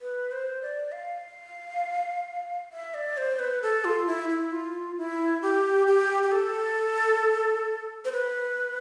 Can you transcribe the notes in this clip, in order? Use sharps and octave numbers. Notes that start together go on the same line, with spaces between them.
B4
C5
D5
F5
E5
D5
C5
B4
A4
F4
E4
E4
F4
E4
G4
G4
G4
A4
C5
B4